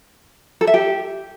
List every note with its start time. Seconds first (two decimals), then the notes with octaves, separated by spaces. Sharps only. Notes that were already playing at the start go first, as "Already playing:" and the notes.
0.61 A4
0.67 E5
0.74 G4